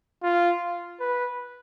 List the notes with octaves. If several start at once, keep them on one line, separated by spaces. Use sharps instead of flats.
F4
B4